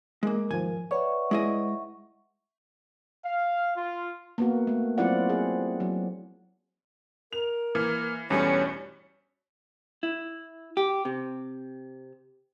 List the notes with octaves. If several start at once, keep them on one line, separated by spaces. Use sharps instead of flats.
G#3 A#3 A#4
D#2 G#2 F3 G#5
B4 C#5 D5 E5 F#5 C#6
G#3 E4 D#5
F5
F4
A#3 B3 F#4
A3
F#3 C4 E4 F4 D5 F#5
G#4
F#3
A#4 F7
E3 A#3 F6
E2 G2 B2 G3 A3 C#4 C#5 C#7
E4
G4
C3